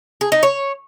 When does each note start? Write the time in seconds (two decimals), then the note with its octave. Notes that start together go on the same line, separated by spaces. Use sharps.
0.21 G#4
0.32 D#4
0.43 C#5